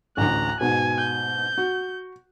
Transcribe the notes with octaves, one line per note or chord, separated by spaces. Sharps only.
A1 D2 A#5 F#6
G#2 B2 G#5
G6
F#4